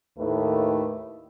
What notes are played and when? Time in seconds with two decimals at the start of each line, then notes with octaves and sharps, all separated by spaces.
0.18 D#2 A2 D#3 A3 B4